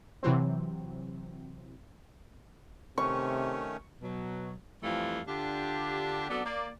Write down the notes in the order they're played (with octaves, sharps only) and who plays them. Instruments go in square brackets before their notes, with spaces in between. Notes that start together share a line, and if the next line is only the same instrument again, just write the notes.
[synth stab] C3 E3 F#3 C4
[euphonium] C3 [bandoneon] D#3 A3 C#4 [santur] C#6
[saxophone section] B2 F#3
F2 E3 F3 G3 A3 F5
D3 D4 F4 G4
F#3 B3 C4 D4 A4 D5
A#3 D5